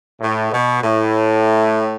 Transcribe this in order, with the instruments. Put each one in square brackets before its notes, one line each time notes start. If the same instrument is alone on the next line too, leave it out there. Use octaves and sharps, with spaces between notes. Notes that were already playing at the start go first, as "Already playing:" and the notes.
[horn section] A2
B2
A2